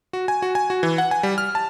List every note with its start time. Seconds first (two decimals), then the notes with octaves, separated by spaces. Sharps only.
0.13 F#4
0.28 G#5
0.42 F#4
0.55 G#5
0.70 F#4
0.83 E3
0.98 F#5
1.11 G#5
1.23 G3
1.38 F6
1.55 A5